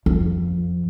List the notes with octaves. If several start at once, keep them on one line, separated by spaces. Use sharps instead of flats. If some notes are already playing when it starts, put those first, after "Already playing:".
F2